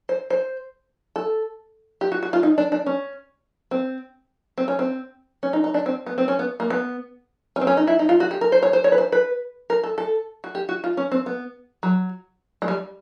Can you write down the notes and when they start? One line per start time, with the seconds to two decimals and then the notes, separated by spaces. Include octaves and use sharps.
0.09 C5
0.30 C5
1.16 A4
2.01 G4
2.12 F#4
2.23 F#4
2.33 F4
2.43 D#4
2.58 D4
2.72 D4
2.86 C#4
3.71 C4
4.58 C4
4.68 C#4
4.79 C4
5.43 C#4
5.53 D#4
5.64 D#4
5.74 D4
5.86 C4
6.06 B3
6.18 C4
6.28 C#4
6.39 B3
6.60 A#3
6.70 B3
7.56 C#4
7.61 C4
7.67 C#4
7.77 D#4
7.87 E4
7.99 D#4
8.09 F4
8.20 F#4
8.31 G4
8.41 A#4
8.52 C5
8.63 C#5
8.73 C5
8.84 C#5
8.92 B4
8.98 C5
9.12 B4
9.70 A#4
9.84 A4
9.98 A4
10.44 F#4
10.55 G4
10.69 F#4
10.84 F4
10.97 C#4
11.12 C4
11.26 B3
11.83 F#3
12.62 G#3
12.68 G3